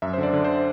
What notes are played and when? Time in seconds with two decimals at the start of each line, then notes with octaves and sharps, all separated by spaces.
0.02 F#2 E5
0.13 C5
0.18 D3
0.23 D5
0.33 D3
0.44 C5